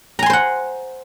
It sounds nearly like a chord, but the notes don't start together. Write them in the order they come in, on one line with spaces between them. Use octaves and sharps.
A#5 G#5 C6 C5 F#5